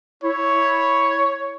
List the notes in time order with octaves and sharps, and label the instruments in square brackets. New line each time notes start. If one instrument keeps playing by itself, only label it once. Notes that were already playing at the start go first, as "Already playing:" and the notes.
[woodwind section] E4 [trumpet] C#5